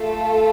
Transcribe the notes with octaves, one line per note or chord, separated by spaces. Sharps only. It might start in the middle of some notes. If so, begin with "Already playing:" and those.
Already playing: A3 F4 A4